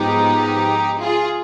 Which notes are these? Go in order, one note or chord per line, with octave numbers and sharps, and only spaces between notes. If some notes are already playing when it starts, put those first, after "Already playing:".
Already playing: G#2 F3 G#3 B3 D#4 G4
F4 G#4